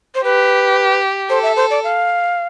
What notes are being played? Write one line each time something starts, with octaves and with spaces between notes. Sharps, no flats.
C5
G4 B4
A4 C5
E5
C5
D5
F5